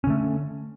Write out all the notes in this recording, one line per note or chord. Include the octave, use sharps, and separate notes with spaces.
D3 A3 C#4